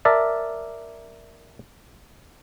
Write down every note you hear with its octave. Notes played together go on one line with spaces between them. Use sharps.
A#4 D5 E5 A5